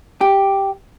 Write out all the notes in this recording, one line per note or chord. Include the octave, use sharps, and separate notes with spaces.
G4